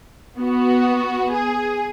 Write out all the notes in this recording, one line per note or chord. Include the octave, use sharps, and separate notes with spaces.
B3 F#4
G#4